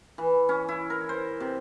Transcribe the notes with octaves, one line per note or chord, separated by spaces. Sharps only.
E3
C#4
E4
A#4
C5
C3